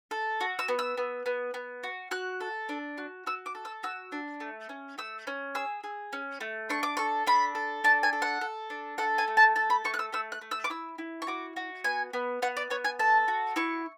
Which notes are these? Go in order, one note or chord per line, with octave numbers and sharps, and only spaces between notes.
A4
F#4
E6
B3
E6
B3
B3
B3
F#4
F#4 F#6
A4
D4
F#4
F#4 E6
D6
A4
E6
F#4 E6
D4
A3
C#4
A3 E6
C#4
G#4 E6
G#4
C#4
A3
D4 C#6
D6
A4 C#6
D4 B5
A4
D4 A5
G#5
A4
F#5
A4
D4
A4 F#5
G#5
A3
A5
A4 A5
B5
A3 C#6
F#6
E6
A3 E6
F#6
A3
E6
D6
E4 E6
E4
C#6
F#4 D6
F#4
B3 G#5
B3
B3 F#5
D5
B3 C#5
G#5
A4 A5
F#4
E4 C#6